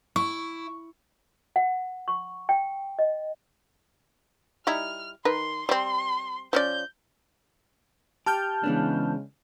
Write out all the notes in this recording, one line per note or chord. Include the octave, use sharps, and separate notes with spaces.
E4 C#6
F#5
C#6
G5
D#5
G3 D#4 E4 F6
D#3 A#4 B4 C6
G3 C4 C6
F3 C#4 D5 G6
G4 A5 F6 G6
C#3 E3 G#3 B3 D4